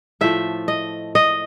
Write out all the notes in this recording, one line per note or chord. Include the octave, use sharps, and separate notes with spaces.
A2 F3 A3 E5
D#5
D#5